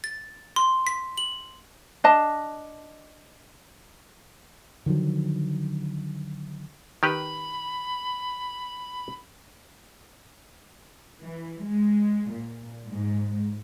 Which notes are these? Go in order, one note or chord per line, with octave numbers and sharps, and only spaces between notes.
A6
C6
B6
F#7
D4 D#5 A5
D3 D#3 F3 F#3
D#3 G4 B4 B5
E3
G#3
A#2
G#2